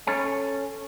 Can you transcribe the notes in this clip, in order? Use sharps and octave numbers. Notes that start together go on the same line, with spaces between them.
C#4 A4 C#5 G#5